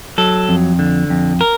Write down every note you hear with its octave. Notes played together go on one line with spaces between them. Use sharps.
F#3 A4
F2
D3
F2
A#4